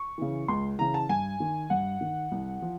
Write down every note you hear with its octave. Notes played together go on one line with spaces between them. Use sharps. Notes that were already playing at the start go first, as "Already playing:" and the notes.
Already playing: C#6
C#3 E3
C#2 C6
C#3 E3 A#5
A5
G2 G#5
D#3
G2 F#5
D#3
C2
F3